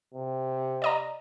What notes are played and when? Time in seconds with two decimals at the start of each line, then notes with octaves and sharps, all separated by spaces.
0.14 C3
0.82 D5 D#5 A#5